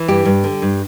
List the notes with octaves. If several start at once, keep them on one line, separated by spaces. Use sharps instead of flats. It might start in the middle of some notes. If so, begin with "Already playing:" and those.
Already playing: E3
G2 G4
G2
D3
G2